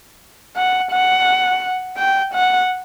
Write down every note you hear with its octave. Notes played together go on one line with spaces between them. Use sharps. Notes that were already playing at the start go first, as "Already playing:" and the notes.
F#5
F#5
G5
F#5